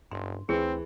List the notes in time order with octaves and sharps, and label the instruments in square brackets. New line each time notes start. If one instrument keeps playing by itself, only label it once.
[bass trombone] F#1 [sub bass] G2 [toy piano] C6
[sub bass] D2 [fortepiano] E3 [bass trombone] C4 [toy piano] G#4